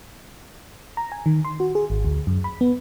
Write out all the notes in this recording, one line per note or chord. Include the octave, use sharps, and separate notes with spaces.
A#5
G#5
D#3
C6
F#4
G#4
G#1
D2
F#2
B5
B3